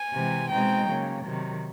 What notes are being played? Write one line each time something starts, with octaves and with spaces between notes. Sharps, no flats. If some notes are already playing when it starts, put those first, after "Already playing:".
Already playing: G#5
C3 E3 G#3 C4
B2 G#3 C4 D#4 G5
C#3 F#3 A#3
C3 D#3 F#3